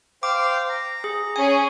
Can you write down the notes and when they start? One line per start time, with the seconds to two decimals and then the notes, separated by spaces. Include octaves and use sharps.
0.23 C5 F5 G5 D6
0.69 A#5
1.04 G#4
1.36 C#4 G#4 G#5